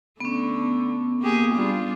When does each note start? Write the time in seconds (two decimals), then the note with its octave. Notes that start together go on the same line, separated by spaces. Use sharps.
0.20 D3 A3 B3 C#4
1.20 A#3 G4 G#4
1.53 G3 D4 F4